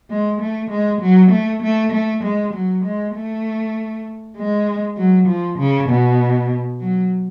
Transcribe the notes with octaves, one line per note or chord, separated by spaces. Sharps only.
G#3
A3
G#3
F#3
A3
A3
A3
G#3
F#3
G#3
A3
G#3
F#3
F3
C#3
B2
F#3